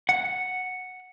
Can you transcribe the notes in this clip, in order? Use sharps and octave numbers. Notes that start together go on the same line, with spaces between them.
F#5